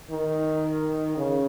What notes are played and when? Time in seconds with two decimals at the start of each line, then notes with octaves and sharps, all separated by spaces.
0.11 D#3
1.17 C#3